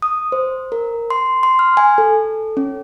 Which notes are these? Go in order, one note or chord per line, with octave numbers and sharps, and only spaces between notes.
D#6
C5
A#4
C6
C6
F6
G#5
A4
C#4